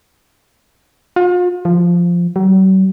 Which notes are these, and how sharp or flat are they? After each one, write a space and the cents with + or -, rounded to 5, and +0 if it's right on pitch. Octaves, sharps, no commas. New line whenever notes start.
F4 +40
F3 -5
F#3 +45